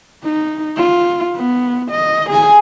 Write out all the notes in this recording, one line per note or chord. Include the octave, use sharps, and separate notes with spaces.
D#4
F4
B3
D#5
G#4 G#5